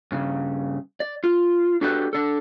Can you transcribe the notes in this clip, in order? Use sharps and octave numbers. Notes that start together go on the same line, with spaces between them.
G2 C#3
D5
F4
D4 F#4 G4 A4 B4 D5
D4 A4